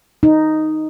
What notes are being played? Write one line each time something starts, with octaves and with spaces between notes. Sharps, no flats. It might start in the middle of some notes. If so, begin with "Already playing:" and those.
D#4